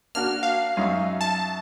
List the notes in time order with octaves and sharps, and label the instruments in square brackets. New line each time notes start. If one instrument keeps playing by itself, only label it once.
[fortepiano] A#3 D4 F#4 [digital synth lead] F6
[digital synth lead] F5
[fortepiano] F#2 D#4 E5
[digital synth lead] A5